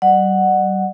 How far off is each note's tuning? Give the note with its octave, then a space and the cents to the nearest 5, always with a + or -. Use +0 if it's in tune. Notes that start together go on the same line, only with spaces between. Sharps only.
G3 -40 D5 +40 F#5 +0